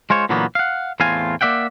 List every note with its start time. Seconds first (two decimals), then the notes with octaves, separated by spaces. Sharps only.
0.10 G#3 F4 C5 C#5
0.29 A#2 D3 E3 F#3 A#3 B3
0.55 F5 F#5
1.00 E2 A2 C4 F4 F5 G#5
1.41 A#3 D5 E5 F#5 G5